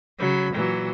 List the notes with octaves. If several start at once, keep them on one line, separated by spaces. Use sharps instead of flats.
C#3 F#3 B5
A#2 E3 F#3